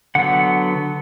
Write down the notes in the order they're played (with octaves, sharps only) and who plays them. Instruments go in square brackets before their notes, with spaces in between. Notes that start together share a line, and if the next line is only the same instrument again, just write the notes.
[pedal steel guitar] D3 F#3 B3 F#5